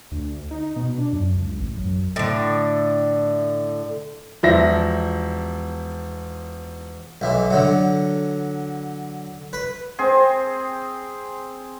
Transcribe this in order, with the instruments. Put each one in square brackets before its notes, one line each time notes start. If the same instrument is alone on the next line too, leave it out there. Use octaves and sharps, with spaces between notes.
[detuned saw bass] D2
D#4
B2
D4
F#2
C#2
A1
F#2
[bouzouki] A2 D3
[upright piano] E1 F3 E5 A#6
[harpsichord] B1 E3
D3 F#3
B4
[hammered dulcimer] C4 G#4